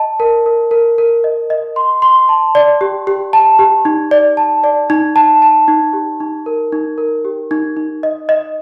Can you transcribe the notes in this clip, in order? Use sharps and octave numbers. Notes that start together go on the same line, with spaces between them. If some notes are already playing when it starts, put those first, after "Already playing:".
Already playing: D#5 A5
A#4
A#4
A#4
A#4
D#5
D#5
C6
C6
A5
D5
G4
G4
A5
G4
D#4
D5
A5
D5
D#4
A5
A5
D#4
G4
D#4
A#4
D#4
A#4
G4
D#4
D#4
D#5
D#5